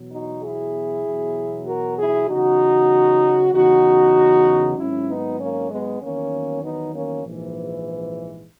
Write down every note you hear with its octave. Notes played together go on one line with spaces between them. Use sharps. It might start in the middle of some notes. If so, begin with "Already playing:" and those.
Already playing: E2 B2 F#3
D#4 F#4
E4 G#4
E2 B2 F#3
F#4 A#4
E4 G#4
E2 C#3 F#3 D#4 F#4
E2 C#3 F#3 D#4 F#4
G#1 G#2 F#3 C#4 E4
B3 D#4
A#3 C#4
G#3 B3
E2 D#3 F#3 A#3 C#4
B3 D#4
A#3 C#4
A#1 G#2 E3